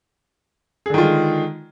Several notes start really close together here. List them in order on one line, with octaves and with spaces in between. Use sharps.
G#4 D3 D#3 F4 G#3